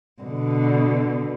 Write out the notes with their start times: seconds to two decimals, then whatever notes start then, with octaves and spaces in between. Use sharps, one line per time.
0.22 B2 D3